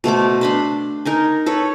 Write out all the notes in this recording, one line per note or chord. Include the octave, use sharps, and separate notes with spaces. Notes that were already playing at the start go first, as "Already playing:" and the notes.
B2 A3 C5 D6
D4 B5 C6
D#4 A#4 G#5
A4 B4 C#5